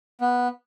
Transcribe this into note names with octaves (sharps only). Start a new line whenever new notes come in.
B3